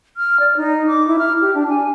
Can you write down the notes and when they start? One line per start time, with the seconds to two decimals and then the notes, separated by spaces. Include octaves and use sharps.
0.17 F6
0.40 D5
0.57 D#4
0.87 D6
1.08 E4
1.19 F6
1.41 G4
1.55 D4
1.70 G#5